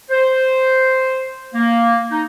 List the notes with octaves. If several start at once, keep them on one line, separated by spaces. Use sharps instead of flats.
C5
A#3
D#4